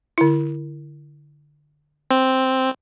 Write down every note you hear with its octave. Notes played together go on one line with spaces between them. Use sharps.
D3 E4
C4